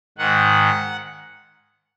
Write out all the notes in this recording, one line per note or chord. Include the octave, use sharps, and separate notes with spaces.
G#2 D#3 F#5